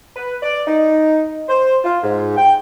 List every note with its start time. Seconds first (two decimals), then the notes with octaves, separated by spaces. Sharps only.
0.16 B4
0.42 D5
0.68 D#4
1.49 C5
1.84 F4
2.03 G#2
2.37 G5